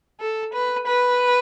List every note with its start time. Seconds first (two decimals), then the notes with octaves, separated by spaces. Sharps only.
0.20 A4
0.53 B4
0.87 B4